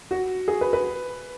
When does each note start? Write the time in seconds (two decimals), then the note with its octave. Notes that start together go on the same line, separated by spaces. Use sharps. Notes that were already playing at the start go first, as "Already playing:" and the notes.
0.11 F#4
0.48 G#4
0.61 B4
0.73 B4